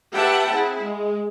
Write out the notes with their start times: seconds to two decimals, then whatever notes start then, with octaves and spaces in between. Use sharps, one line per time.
0.13 G4 B4 E5 F#5 G5 A5
0.49 C4 E4 G#4
0.81 G#3